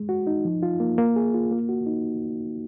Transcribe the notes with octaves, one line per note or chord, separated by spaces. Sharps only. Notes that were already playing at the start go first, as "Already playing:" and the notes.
Already playing: G#3
F#4
D#4
F3
F4
A#3
A#3
G#4
F4
A#3
F#4
D#4